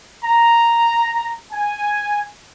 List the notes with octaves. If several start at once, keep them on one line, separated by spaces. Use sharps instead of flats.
A#5
G#5